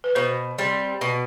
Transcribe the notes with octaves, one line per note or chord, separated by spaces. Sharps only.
B4
B2 C5
G3 C4
B2